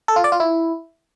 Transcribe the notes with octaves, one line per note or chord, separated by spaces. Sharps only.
A4
F4
D5
F4
E4